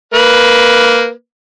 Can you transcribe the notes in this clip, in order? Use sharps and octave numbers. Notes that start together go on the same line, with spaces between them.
A#3 B4